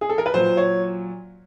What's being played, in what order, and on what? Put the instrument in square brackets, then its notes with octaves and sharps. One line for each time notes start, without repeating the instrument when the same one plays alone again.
[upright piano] G#4
A4
A#4
B4
A#2 F#3 C5
C#5